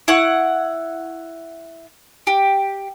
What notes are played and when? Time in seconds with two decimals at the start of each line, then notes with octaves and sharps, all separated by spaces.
0.08 E4 F#5 C#6
2.27 G4